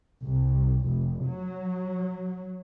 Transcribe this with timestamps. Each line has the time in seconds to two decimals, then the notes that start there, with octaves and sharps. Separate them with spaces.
0.23 C2
0.86 F1
1.25 F#3